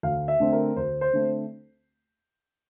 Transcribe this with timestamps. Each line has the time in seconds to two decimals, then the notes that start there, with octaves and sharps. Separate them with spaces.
0.03 D2 F5
0.28 E5
0.40 D3 A3 C4
0.52 A#4
0.76 D2 C5
1.01 C5
1.13 D3 A3 C4